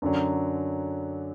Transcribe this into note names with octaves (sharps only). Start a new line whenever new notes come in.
F#2 D3 F#3